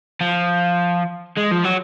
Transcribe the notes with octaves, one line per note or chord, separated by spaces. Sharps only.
F3
G#3
F3
F#3